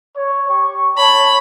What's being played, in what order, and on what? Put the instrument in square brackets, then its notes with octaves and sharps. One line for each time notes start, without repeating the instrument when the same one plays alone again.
[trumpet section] C#5
G4 C#6
[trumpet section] C#5 A5 [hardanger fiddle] B5